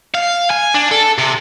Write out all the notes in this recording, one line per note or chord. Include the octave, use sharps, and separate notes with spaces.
F5
G#5
D4
A4
C3